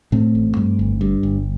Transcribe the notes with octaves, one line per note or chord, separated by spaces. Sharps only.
A2 A3 C4
A1
G2
G1
G2
G1